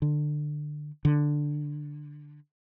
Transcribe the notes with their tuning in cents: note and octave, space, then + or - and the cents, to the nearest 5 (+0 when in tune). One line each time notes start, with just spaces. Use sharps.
D3 +20
D3 +5